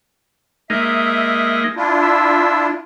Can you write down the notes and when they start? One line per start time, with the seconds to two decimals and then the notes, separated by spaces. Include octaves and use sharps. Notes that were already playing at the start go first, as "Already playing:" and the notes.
0.70 G#3 A#3 D#4 E5
1.76 D4 E4 F4
2.03 E5